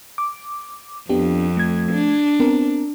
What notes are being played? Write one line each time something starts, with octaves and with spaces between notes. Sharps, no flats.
D6
F2 B3 D4 G4
A3 G#6
D4
B3 C4 A#4